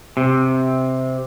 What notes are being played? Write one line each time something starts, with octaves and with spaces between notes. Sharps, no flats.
C3